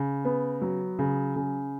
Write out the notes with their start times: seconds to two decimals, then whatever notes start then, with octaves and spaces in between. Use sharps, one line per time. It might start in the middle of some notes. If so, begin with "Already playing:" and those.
Already playing: C#3
0.25 B3
0.62 F#3
0.99 C#3
1.36 C#3